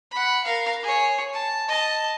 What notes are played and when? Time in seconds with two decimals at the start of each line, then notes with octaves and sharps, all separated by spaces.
0.11 F#5 B5
0.44 A#4 F5
0.83 G#4 C#5
1.33 A5
1.69 D#5 A5